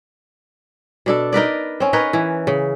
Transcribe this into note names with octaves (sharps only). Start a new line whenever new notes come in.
B2 D4 A4
D#4 A#4 B4 D5
C4 C#4
D#4 A#4 B4 C#5
E3
C#3